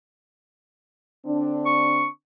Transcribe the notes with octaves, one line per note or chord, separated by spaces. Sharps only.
D3 C4 D4
C#6